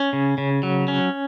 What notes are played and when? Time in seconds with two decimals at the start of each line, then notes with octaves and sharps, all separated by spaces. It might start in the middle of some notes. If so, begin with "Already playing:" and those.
Already playing: C#4
0.13 C#3
0.38 C#3
0.63 F#3
0.88 C#4